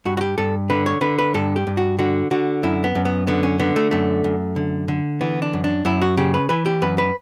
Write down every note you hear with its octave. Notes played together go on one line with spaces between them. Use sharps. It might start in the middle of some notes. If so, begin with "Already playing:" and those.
G2 F#4
F#4
G4
G2 A4
D3 B4
C#5
D3 B4
B4
G2 A4
G4
G2
F#4
D3 F#4
D3 F#4
F#2 E4
B3
F#2
B3
D3 B3
C#4
D3 B3
A3
F#2 A3
F#2
D3
D3
E3 B3
D4
F#2
D4
F#2 E4
F#4
C#3 G4
B4
E3 B4
G4
F#2 B4
B4